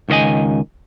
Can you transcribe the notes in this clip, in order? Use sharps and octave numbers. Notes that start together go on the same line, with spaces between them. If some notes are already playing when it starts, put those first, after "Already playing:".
C#2 D#3 A4 D#5 G#5